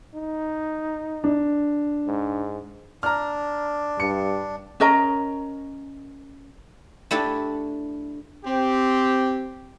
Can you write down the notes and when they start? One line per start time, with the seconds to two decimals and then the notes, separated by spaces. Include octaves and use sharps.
0.15 D#4
1.24 D4
2.07 G#2
3.03 D4 A#5 F6
4.00 G2 C#7
4.80 C#4 A#4 D#5 A#5
7.11 A3 D4 E4 G4 A4
8.45 C4 G4